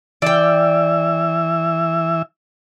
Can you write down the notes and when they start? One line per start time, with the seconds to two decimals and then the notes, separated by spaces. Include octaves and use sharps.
0.22 E3 D5 E5 G5